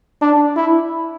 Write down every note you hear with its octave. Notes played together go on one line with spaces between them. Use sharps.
D4
E4